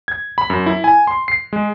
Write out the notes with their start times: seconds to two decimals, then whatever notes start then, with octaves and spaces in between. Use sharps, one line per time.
0.08 G#6
0.38 B5
0.50 F#2
0.66 E4
0.84 G#5
1.07 C6
1.28 C7
1.53 G#3